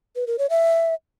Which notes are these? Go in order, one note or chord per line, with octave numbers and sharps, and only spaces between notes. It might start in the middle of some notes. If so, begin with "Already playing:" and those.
B4
A#4
C#5
E5